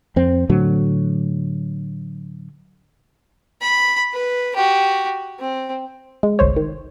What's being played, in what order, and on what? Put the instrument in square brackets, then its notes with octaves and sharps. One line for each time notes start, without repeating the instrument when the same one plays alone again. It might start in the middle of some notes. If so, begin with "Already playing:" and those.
[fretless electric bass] F2 C4
A2 D3 F#3
[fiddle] B5
B4
F#4 G4
C4
[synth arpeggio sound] G#3
G1 C2 C5 C#5
D#3